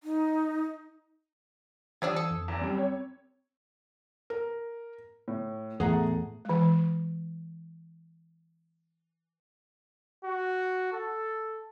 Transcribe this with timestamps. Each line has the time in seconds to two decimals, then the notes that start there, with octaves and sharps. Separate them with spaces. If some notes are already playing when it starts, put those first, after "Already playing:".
0.04 D#4
2.02 E3 F3 G3 D4 D#6 E6 G#6
2.16 A4
2.31 F2
2.48 E2
2.61 F#2 G3 C4
2.78 C#5
4.30 A#4
5.28 A2
5.80 E2 A2 A3 G#4 F#5 A#5
6.45 E3 G#3
10.24 F#4
10.93 A4